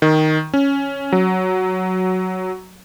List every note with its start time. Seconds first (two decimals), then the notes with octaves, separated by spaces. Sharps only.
0.02 D#3
0.54 C#4
1.12 F#3